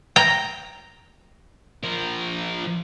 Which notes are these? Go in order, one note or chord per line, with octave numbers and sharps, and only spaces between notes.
G5 A#5
F3 A#4